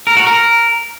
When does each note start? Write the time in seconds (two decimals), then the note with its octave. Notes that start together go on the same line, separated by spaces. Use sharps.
0.07 A#4
0.17 F#4
0.27 A#4